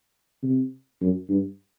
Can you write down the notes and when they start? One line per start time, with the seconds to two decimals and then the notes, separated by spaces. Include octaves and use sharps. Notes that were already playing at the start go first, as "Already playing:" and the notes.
0.43 C3
1.01 F#2
1.29 G2